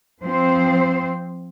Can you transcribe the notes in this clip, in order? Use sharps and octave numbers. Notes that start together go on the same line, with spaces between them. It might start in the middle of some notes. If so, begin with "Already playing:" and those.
F3 C4 C5